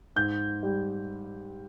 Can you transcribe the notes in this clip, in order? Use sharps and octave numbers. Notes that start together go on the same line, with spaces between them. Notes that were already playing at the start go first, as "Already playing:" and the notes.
G#2 G6
G3